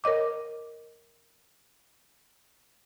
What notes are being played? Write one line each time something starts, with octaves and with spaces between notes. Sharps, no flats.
A#4 C#5 D#5 D6